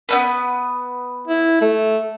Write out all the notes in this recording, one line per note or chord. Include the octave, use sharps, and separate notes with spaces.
B3 C#4 B4
E4
A3